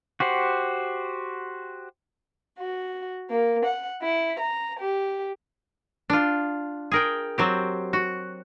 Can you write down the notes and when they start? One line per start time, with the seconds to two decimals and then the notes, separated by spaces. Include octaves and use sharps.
0.20 F#4 G4 C5 F#5
2.57 F#4
3.30 A#3
3.63 F#5
4.01 E4
4.39 A#5
4.79 G4
6.10 D4 F4
6.91 G#4 A#4 G5
7.38 F#3 C4 G4
7.93 F#4